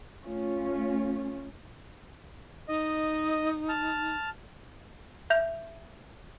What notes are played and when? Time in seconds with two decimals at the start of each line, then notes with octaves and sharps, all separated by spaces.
0.23 A3 C#4 F4
2.68 D#4 D#5
3.69 A5 F6
5.30 E5 G6 F7